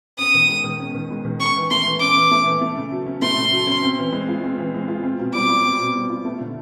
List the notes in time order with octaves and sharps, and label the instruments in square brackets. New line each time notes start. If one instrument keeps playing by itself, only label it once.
[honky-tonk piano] C#4 [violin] D#6
[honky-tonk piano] D#3
G#3
D#3
C#4
D#3
G#3
D#3
[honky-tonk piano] C#4 [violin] C#6
[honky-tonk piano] E3
[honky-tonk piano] A3 [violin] C6
[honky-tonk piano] E3
[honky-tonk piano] C#4 [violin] D6
[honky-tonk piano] E3
A3
E3
A3
C#3
F#3
C#4
[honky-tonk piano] A3 [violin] C6
[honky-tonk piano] C#3
F#3
C#4
C4
E3
G#3
F4
C4
E3
G#3
F4
C4
B2
[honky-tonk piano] G3 [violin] D6
[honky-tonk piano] F4
C4
B2
G3
F4
A3
D3